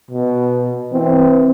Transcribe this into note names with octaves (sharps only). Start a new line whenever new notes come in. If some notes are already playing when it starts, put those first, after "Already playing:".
B2
E3 C4